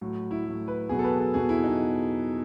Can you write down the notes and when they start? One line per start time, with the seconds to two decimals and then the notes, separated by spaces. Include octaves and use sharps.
0.01 A2 F#3
0.31 E4
0.45 A2 F#3
0.68 B4
0.89 E2 B2 F#3 G#4
0.99 A4
1.04 B4
1.19 A4
1.34 E2 B2 F#3 G#4
1.49 E4
1.64 D#4